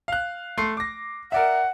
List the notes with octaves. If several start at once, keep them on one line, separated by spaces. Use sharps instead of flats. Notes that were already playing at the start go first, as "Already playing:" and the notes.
F5 F#6
A3 C6 C7
D6 A#6
A#4 D5 E5 F#5